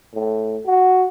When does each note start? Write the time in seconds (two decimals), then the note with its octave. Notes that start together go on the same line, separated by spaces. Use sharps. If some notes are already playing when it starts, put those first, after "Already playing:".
0.15 A2
0.66 F#4